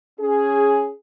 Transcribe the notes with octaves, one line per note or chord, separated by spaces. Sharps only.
C#4 G#4